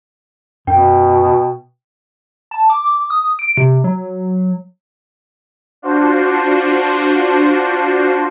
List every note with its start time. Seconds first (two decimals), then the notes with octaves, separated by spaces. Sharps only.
0.67 F#2 B2 G5
2.51 A5
2.70 D6
3.10 D#6
3.39 D7
3.57 C3
3.84 F#3
5.82 D4 F4 F#4 C5